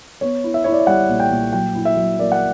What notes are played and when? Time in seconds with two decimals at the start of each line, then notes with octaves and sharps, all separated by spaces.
0.21 B3 C#5
0.44 E4
0.54 E5
0.64 E4 C#5
0.72 D5
0.79 E5
0.87 G3 F#5
1.09 A#2
1.20 G5
1.31 A#2
1.53 F#3 G5
1.75 E4
1.85 E5
1.96 F#3
2.19 A#3 D5
2.32 F#5